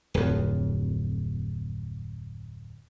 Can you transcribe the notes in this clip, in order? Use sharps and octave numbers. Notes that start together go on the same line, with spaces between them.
D1 F2